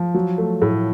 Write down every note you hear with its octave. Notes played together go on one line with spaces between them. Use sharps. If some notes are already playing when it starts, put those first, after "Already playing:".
Already playing: F3
F#3
A3
A2